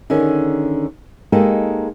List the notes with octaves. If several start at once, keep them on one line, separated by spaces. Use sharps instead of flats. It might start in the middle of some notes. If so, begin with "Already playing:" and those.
D3 D#3 C#4 G#4
G#3 A#3 D#4 G4 A4